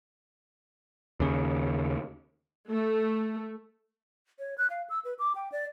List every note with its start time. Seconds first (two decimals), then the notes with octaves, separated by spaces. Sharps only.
1.20 D#2 C#3
2.68 A3
4.39 C#5
4.58 F#6
4.70 F5
4.90 E6
5.05 B4
5.19 D6
5.35 G5
5.52 D5